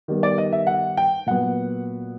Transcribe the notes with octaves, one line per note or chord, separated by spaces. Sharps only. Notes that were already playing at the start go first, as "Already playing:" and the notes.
D#3 G3 B3
D5
D#5
E5
F#5
G5
A#2 F#3 B3 F#5